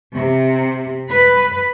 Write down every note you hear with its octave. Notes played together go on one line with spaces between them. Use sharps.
C3
B4